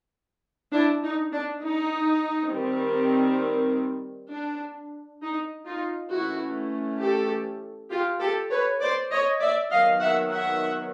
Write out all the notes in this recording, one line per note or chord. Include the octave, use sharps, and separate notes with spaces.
D4 E4
D#4
D4
D#4
D#3 G3 C4
D4
D#4
D#4 F4
E3 A3 C#4 E4 F#4
G4 A4
F4 G4
G4 A4
B4 C#5
C5 D5
C#5 D#5
D5 E5
D#3 F#3 B3 D#5 F5
E5 F#5
E5 F#5